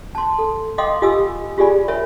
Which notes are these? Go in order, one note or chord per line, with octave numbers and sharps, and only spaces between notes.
A5 C6
A4
D#5 F5 G5 C6 D6 D#6
F4 G4 D#5 G#5 D#6 E6
F4 G4 G#4 D5 G#5 B5
A#4 C#5 E5 G#5 B5